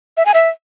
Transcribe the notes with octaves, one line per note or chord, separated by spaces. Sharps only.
E5
G#5
E5